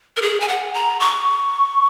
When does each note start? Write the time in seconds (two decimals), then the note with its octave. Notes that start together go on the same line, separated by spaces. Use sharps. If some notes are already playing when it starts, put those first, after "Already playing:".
0.17 A#4
0.22 G#4
0.40 G#5
0.48 F#5
0.74 A#5
1.00 C#6